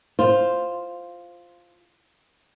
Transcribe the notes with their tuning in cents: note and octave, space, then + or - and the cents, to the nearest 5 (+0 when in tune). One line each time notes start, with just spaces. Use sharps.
F4 +0 C5 +0